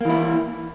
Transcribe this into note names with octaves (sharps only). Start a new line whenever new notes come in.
E3 A#3 E4